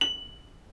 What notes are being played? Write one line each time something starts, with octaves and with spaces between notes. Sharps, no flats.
F#7